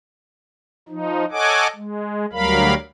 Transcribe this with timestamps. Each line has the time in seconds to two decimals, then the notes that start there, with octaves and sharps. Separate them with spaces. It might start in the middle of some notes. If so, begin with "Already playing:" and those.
0.89 F3 D#4
1.32 A4 C#5 D#5 F#5 G#5 D6
1.76 G#3
2.33 D2 F#3 G3 A#4 F5 B5